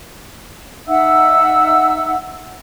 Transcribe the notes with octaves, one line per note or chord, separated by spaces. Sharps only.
D#4 E5 F#5 E6